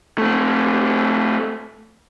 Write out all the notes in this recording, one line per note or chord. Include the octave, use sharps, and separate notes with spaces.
A3 C4